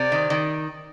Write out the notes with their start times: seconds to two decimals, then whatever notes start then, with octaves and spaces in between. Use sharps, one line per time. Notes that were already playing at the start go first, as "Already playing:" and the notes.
Already playing: C3 D5
0.12 D#3
0.30 D#3